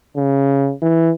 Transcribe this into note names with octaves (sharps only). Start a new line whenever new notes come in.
C#3
E3